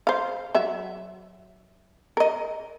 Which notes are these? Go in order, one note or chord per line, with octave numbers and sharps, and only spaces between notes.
C5 F5
F#3 E5
A#4 D#5